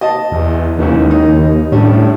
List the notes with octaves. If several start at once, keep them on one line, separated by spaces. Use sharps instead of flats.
D#5 A5
E2
D#2 G#2 C#3 E3
D#4
A2 G3 C#4 D4